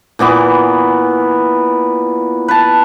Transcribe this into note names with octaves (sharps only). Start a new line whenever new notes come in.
A#2 E3 B3 D6
B4 A5